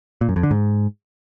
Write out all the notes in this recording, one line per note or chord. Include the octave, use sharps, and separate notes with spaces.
A#2
F#2
F2
D3
G#2